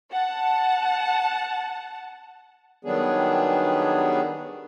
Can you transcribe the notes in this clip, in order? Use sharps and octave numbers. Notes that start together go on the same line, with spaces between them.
F#5 A5
D#3 F#3 G3 B3 D4 G#4